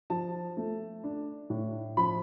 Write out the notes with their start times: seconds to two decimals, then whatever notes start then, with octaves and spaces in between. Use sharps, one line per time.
0.10 F3 A5
0.57 A3
1.04 D4
1.50 A2
1.97 F3 B5